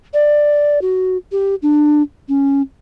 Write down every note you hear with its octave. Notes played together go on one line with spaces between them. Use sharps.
D5
F#4
G4
D4
C#4